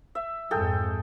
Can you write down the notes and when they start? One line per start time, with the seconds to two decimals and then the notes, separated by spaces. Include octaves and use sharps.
0.15 E5
0.51 F2 G#2 G#4 A4 G5